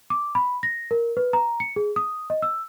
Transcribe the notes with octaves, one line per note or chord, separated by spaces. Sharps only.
D6
B5
A#6
A#4
B4
A#5
C#7
G#4
D#6
D#5
E6